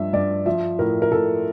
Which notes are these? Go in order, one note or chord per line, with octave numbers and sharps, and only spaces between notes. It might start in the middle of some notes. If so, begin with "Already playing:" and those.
Already playing: G2 F3 E5
G2 D5
F3 E5
A2 A#4
A#4
A2 A4